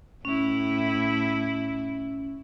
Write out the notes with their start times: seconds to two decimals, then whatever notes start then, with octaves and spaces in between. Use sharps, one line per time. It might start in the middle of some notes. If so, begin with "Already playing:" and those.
0.25 A2 C#4 E4